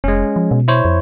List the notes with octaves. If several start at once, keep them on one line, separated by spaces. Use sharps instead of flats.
F1 G#3 C#4
F3
B2
E4 C5 C#5
F2